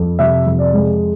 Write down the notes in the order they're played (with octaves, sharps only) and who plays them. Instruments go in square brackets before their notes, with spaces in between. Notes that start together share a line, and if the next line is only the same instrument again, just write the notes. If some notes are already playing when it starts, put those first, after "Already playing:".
Already playing: [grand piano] F2
C3 E5
F2
D5
G#3